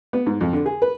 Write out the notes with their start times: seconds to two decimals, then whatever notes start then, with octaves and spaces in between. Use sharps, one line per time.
0.13 B3
0.27 G#2
0.41 F2
0.53 D3
0.66 G#4
0.82 B4